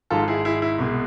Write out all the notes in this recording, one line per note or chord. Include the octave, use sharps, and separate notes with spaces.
G#1 G#2 G#3 F4 A4
E4 G#4
E4 G#4
E4
C2 B2 G#3